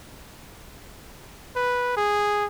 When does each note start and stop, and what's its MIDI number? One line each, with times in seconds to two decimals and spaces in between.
1.56 1.93 71
1.97 2.46 68